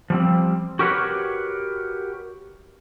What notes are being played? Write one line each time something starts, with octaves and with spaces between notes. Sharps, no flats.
F3 G3 C4
F#4 G4 A#4 B4 C#5 F#5